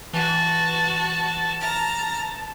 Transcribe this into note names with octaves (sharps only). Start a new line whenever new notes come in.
E3 F#4 A5
A#5 F6